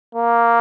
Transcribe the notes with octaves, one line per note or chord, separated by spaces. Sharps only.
A#3